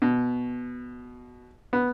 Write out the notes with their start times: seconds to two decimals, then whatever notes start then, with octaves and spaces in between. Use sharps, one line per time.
0.02 B2
1.73 B3